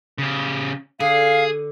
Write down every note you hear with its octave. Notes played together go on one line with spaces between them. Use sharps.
C#3 G4
D3 G#4 F5